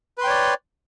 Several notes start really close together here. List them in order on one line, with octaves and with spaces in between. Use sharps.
B4 C6 G5 C#5 D5